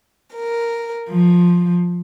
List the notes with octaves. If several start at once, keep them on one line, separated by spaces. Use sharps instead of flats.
A#4
F3